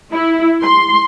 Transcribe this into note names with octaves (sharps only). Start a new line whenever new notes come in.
E4
C6